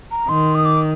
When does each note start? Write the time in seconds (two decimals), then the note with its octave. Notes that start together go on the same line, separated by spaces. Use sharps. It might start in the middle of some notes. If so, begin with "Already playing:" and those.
0.11 A#5
0.29 D#3 C6
0.55 D#6
0.65 D6